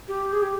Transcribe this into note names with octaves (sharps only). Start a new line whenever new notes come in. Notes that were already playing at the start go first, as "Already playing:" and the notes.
G4
G#4
G4